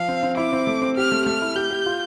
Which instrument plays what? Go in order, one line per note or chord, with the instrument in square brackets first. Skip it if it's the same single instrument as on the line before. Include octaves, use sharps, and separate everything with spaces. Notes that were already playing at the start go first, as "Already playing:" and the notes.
Already playing: [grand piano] F3 [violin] F5
[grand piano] C4
C4
[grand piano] E4 [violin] D6
[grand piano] C4
A3
C4
[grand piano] G4 [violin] F6
[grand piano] A3
[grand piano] A3 [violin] F6
[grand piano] E4
[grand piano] G4 [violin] G6
[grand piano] G4
F4